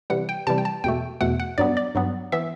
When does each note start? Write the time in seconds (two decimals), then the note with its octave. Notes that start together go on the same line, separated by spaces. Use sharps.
0.10 C3 E3 G3 F#5
0.29 G5
0.47 C3 E3 G3 A5
0.58 G5
0.65 A5
0.84 E2 B2 A3 G5
1.21 E2 B2 A3 F#5
1.40 F#5
1.58 G2 F#3 B3 D5
1.77 D5
1.95 G2 F#3 B3
2.32 E3 B3 E5